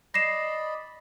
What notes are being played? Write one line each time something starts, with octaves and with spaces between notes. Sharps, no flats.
D5 D#5 B5 A#6 C7 E7